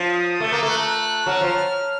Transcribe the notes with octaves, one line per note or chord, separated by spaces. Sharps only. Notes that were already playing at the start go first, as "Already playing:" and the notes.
Already playing: F3
D#6
A3
A#3
A3
F#6
F#3 F6
F3